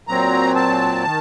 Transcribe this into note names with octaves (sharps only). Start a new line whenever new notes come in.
A#2 F#3 C4 A#5
A5
D#3